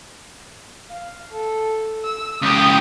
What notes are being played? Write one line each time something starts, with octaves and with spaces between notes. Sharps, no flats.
F5
A4
E6
C#2 G4 D#6